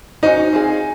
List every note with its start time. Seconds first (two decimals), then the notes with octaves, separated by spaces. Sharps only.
0.23 C#4 D#4 F#4 C5 D#5
0.53 C4 F4 G#4